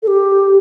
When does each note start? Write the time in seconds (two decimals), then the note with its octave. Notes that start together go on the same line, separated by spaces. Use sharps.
0.03 A4
0.07 G4